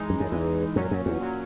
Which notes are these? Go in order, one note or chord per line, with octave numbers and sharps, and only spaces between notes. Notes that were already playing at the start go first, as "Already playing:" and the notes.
Already playing: E3 G#3 D#4
F#2
F#2
E2 E3 G#3 D#4
F#2 A#2 F#3 C#4
F#2
E2
A#2 F#3 C#4